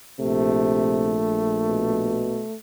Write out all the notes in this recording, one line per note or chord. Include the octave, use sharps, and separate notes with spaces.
A#1 C3 A3
B2